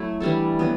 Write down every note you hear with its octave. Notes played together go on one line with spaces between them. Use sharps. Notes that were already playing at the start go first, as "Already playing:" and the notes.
Already playing: F#3 A3 E4
E3 G3 D4 A4
F#3 B3